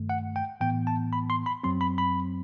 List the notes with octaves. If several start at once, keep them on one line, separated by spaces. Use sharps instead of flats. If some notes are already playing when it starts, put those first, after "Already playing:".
Already playing: G2 D#3 A3
F#5
G5
A2 E3 B3 G5
A5
B5
C6
B5
F#2 F#3 C4 C6
B5
B5